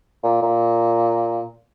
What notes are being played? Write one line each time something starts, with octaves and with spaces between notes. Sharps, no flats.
A#2
A#2